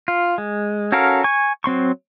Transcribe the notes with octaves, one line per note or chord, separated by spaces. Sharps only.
F4
G#3
C#4 F#4 A4 A#4 F5
G#5 C#6
F#3 C4 C6 C#6